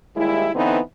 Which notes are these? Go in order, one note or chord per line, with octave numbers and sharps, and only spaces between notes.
D#2 G3 G#3 E4
D3 E3 B3 C4 D#4